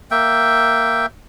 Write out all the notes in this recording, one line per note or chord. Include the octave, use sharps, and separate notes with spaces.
A#3 E5 G5